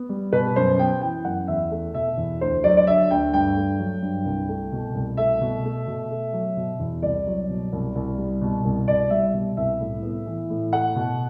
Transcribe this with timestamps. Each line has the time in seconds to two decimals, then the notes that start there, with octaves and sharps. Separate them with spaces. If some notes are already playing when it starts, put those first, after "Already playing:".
Already playing: B3
0.09 G3
0.33 B2 B4
0.56 F#2 C5
0.78 B3 G5
1.01 E3 G5
1.25 F#2 F#5
1.48 E2 E5
1.71 A3
1.94 B2 E5
2.17 E2
2.41 D2 C5
2.64 F#3 D5
2.77 D5
2.87 D3 E5
3.11 D2 G5
3.33 G2 G5
3.56 A3
3.79 F#3
4.02 G2
4.25 C2
4.49 A3
4.72 B2
4.95 C2
5.17 A3 E5
5.41 B2
5.65 A3
5.88 B2
6.11 A3
6.33 F#3
6.57 B2
6.79 E2
7.02 C2 D5
7.27 F#3
7.50 B2
7.73 C2
7.95 C2
8.18 G3
8.42 B2
8.65 C2
8.88 C2 D5
9.10 G3 E5
9.34 B2
9.57 C2 E5
9.80 A2
10.03 B3
10.27 E3
10.50 A2
10.73 A3 F#5
10.96 B2